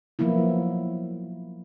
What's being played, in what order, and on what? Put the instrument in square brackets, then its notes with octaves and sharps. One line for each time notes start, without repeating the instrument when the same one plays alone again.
[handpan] F3 F#3 A#3 B3 E4